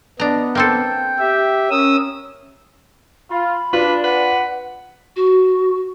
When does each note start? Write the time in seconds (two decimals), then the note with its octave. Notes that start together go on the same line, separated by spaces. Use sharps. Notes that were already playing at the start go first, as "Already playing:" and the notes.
0.20 B3 D4 D#5 A#5
0.55 A#3 C4 A4 G5
1.19 G4 E5
1.71 C#4 A#4 D#6 E6
3.30 F4 B5
3.73 D4 F4 B4
4.04 B4 F#5
5.16 F#4